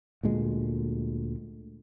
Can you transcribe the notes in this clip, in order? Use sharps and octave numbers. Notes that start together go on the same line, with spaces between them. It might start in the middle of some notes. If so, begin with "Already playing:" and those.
D2 A#2 G#3